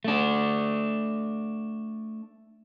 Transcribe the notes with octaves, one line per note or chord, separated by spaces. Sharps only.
A3 D4